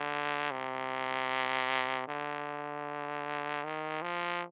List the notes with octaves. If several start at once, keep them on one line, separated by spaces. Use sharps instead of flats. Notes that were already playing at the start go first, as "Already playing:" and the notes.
Already playing: D3
C3
D3
D#3
F3